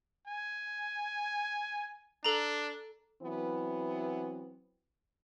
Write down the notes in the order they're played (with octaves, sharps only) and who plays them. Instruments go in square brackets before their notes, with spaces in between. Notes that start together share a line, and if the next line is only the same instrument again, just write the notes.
[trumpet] G#5
[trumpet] D4 [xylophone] A4 A#5
[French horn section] E3 F#3 B3 C4 E4